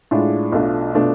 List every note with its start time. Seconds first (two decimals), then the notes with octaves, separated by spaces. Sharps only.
0.11 A2 G#3 D4 F4
0.52 B1 B2 A3 D4 F4
0.93 B2 A3 D4 F4